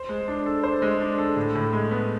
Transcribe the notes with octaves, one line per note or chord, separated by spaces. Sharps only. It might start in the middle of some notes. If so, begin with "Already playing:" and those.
Already playing: C5
G#3
D4
A4
C5
G#3
D4
A4
A2
A2
G#3
B3